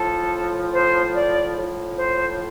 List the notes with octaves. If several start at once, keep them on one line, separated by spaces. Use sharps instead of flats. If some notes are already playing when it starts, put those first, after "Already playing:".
Already playing: A2 F3 A4
C5
D5
A2 F3
C5